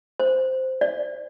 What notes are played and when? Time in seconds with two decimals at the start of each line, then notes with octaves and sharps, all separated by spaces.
0.20 C5
0.81 D5